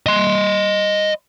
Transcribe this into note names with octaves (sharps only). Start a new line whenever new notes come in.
D#5 C6